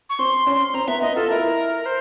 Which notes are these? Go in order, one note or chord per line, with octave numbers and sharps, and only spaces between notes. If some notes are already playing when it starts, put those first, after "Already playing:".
C#6
C4 C6
C#4
C4 A#5
B3 E5
B3 D#5
F4 A4
E4 A#4
C5